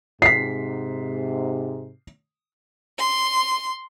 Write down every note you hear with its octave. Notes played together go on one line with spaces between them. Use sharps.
G#2 C3 B6 C7
C6